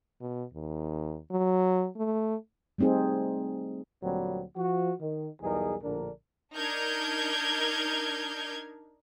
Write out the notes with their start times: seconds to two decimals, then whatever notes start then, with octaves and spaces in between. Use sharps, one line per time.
0.21 B2
0.54 D#2
1.31 F#3
1.97 A3
2.78 G3 A3 C4 D#4 G#4
4.03 D2 A#2 F#3 G3 C4
4.56 F3 F#4
5.01 D#3
5.41 B1 E2 G3 D#4 G#4 A#4
5.83 A#1 A2 D3 D4 A#4
6.54 D4 D#4 A#4 F6 G6 G#6